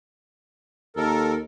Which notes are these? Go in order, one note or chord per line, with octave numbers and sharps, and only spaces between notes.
D#2 A4 A#4